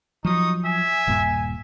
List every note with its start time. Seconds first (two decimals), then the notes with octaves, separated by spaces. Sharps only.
0.25 F3 F#3 D#4 C#6 D#6
0.65 E5 G#5
1.07 D#1 G2 A#2